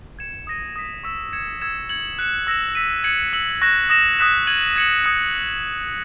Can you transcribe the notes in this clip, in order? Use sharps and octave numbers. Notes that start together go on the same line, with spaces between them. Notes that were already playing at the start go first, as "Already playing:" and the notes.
G#6 C#7 E7
D#6 A#6 D#7
D#6 G#6 B6
C#6 E6 B6 E7
G#6 C#7 E7
E6 G#6 C#7 E7
G#6 C#7 F#7
F#6 C#7 E7
E6 A#6 E7
E6 B6 D#7
G#6 C#7 F#7
E6 B6 F#7
C#6 F#6 A#6 E7
D#6 A#6 E7
D#6 F#6 B6 E7
G#6 D#7 F#7
G#6 C#7 F#7
D#6 G#6 C#7